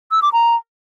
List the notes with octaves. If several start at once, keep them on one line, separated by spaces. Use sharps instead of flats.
E6
D6
A#5